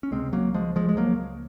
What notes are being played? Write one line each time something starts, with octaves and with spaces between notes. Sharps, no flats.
C#4
C#2 C3 G#3 C4
F#3 A#3
F3 G#3
F3 G#3
G#3
F#3 A#3